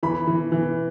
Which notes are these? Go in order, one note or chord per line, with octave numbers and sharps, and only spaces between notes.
E3 B5
E3
E3